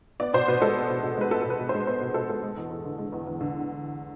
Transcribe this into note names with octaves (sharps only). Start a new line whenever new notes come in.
B3 D5
B2 C5
B2 B4
G#3 A4
B3
B2
B2
G#3 B4
B3 A4
A4
B2
B4
B2
G#3 C5
B3 C5
B2
B2 A4
G#3 A4
G#3
E2
E2
D3
G#3
E2
E2
D3